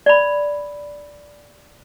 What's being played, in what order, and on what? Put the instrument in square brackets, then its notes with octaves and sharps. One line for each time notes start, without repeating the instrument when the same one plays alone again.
[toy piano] D5 B5